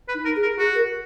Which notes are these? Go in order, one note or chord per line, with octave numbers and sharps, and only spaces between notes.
B4
D#4
A#4
G#4
A#4
F#4 G#4
A#4